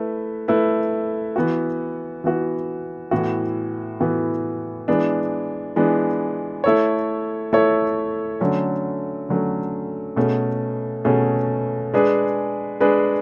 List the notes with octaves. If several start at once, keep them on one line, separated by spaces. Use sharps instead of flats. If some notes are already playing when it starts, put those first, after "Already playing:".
Already playing: A3 E4 B4
A3 E4 B4
E3 B3 F#4
E3 B3 F#4
A2 E3 B3 F#4
A2 E3 B3 F#4
E3 G#3 B3 D4
E3 G#3 B3 D4
A3 E4 A4 C#5
A3 E4 A4 C#5
D3 F#3 A3 C#4
D3 F#3 A3 C#4
B2 A3 C#4 G#4
B2 A3 C#4 G#4
G#3 D4 G#4 B4
G#3 D4 G#4 B4